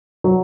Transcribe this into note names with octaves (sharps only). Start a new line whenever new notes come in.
F#3